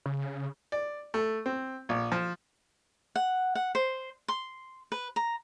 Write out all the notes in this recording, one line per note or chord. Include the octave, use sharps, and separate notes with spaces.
C#3
D5
A3
C4
A#1
F3
F#5
F#5
C5
C6
B4
A#5